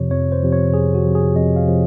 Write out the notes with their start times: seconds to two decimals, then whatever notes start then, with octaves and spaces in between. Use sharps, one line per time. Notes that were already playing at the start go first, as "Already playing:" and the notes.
Already playing: F2 C3 F3 C#5
0.10 F2 C#5
0.32 C5
0.43 C3 F3
0.52 C#5
0.73 F2 G#4
0.95 F#4
1.05 C3 F3
1.15 G#4
1.35 F2 D#5
1.56 F5
1.67 C3 F3